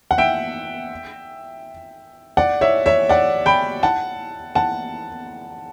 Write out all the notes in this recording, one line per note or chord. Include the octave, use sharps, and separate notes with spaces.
F#5
E5 G5
D5 F#5
C#5 E5
C#5 E5
D5 F#5
G5 B5
F#5 A5
F#5 A5